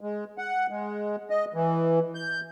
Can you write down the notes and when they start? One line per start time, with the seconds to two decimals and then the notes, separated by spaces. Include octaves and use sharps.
0.01 G#3
0.38 F#5
0.70 G#3
1.30 D#5
1.54 E3
2.15 G6